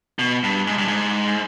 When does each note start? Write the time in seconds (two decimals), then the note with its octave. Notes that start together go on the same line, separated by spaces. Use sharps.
0.19 B2
0.43 G2
0.67 G#2
0.78 G2
0.88 G#2